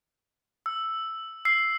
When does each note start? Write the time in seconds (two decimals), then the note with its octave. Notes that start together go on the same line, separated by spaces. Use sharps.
0.66 E6
1.45 E6 C7